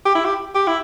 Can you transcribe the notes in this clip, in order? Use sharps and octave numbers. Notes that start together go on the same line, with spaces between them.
G4
E4
G4
G4
E4